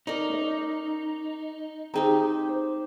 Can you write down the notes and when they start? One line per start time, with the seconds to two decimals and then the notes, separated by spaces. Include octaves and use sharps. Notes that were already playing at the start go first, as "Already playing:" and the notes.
0.07 D#4 A#4 D5
0.29 C#4 D#5
1.94 C4 D#4 G4 G#4 G5 A#5
2.49 C5